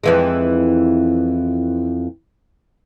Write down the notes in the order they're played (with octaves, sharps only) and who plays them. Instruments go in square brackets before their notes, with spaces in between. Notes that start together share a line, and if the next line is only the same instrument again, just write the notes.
[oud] F2 E3 G#3